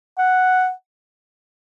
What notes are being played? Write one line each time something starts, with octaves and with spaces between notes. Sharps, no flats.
F#5